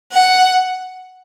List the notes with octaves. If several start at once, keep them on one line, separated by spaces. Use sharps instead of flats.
F#5